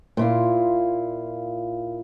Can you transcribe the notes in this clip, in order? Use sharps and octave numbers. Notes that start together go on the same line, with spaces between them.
A#2 E4 F4